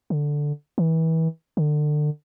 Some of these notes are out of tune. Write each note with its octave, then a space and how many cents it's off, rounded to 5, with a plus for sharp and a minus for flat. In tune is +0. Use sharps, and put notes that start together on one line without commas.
D3 +0
E3 -30
D3 +30